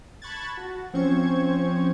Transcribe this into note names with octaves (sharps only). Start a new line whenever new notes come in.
A5 B5 C#6 F#6 G#6 A6
F#4
F3 C4 C#4 C5 C#6 G#6